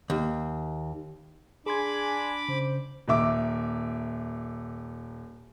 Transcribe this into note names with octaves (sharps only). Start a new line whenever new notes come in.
D#2
D4 G#4 G#5 B5 C6 D6 G#6
C#3 C5
D#1 D#3 E5 D6